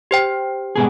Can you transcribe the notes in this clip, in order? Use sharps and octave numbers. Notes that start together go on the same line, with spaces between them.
G4 C5 G5
G#2 B2 G#4